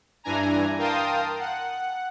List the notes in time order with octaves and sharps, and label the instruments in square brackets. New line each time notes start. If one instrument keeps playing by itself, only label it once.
[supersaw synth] G2 E3 D4 G#5 A#5
A#4 F5 G5 A5 C6 D#6
F#5